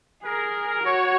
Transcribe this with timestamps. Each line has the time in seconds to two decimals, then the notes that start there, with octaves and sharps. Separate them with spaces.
0.23 G#4 A#4
0.83 F#4 C#5